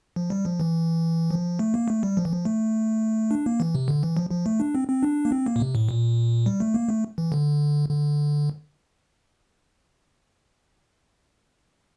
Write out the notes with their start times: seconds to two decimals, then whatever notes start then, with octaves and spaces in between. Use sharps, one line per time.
0.16 F3
0.30 G3
0.45 F3
0.60 E3
1.31 F3
1.59 A3
1.74 A#3
1.88 A3
2.03 G3
2.17 F3
2.25 E3
2.33 F3
2.45 A3
3.31 D4
3.46 A#3
3.60 E3
3.75 C3
3.88 D3
4.03 E3
4.17 F3
4.31 F3
4.46 A3
4.60 D4
4.75 C4
4.89 C4
5.03 D4
5.25 A#3
5.32 C4
5.46 A#3
5.56 A#2
5.60 C3
5.75 A2
5.89 A#2
6.46 G3
6.60 A3
6.74 A#3
6.89 A3
7.18 E3
7.32 D3
7.90 D3